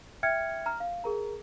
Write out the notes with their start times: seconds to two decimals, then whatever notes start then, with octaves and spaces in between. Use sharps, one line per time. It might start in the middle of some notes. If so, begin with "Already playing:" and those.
0.23 E5 G5 F6 G#6 C#7
0.66 A#5 F6
0.80 F5
1.04 G#4 A#4 A#5